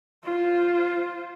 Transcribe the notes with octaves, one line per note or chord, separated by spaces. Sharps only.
F4 C5